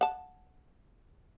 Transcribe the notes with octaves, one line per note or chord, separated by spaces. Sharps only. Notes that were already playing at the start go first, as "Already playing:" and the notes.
F#5 A5